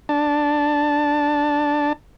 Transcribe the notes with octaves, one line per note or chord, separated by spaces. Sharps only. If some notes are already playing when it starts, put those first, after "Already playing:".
D4 A5